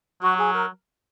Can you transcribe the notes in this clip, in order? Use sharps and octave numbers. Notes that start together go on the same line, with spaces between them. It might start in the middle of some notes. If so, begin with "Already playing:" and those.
F#3 F#4
G#4
A#4